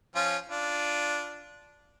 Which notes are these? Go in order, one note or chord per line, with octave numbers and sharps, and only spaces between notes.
F3 C#4 F4
D4 F4